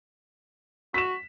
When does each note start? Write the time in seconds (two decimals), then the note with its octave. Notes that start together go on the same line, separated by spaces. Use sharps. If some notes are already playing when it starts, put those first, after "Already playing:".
0.94 F#4 B6 E7